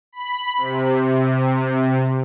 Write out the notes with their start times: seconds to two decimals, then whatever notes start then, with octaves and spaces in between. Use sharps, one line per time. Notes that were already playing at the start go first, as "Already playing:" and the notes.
0.12 B5
0.58 C3